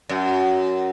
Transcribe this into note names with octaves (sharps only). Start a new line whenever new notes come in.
F#2